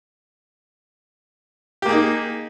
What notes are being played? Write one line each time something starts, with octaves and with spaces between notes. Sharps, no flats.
A#3 D#4 G4 G#4